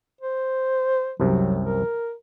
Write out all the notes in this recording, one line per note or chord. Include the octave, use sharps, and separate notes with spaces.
C5
C2 F#2 C3 F#3
A#4